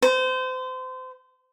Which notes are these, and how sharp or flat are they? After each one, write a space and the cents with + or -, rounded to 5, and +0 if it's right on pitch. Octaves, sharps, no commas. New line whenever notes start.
C5 -30